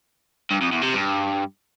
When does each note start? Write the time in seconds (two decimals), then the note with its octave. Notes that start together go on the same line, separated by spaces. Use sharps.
0.51 G2
0.62 F2
0.72 E2
0.83 C3
0.94 G2